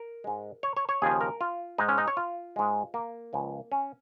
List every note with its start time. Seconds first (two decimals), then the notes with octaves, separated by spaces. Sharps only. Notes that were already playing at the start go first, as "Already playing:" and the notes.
Already playing: A#4
0.24 G#2 G#3
0.63 C#5
0.77 C#5
0.89 C#5
1.02 D#2 C#3 F3 G#4
1.21 A#4
1.41 F4
1.78 G#2 G#3 D#4
1.89 C#4
1.98 D#4
2.08 C#5
2.17 F4
2.56 G#2 G#3
2.94 A#3
3.33 C#2 C#3 F3
3.72 C#4